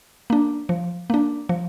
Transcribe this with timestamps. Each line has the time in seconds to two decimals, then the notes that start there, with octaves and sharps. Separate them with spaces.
0.30 A#3 D4
0.69 F3
1.10 A#3 D4
1.49 F3